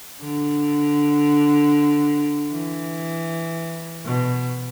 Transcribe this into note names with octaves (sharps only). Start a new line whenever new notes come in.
D3
E3
B2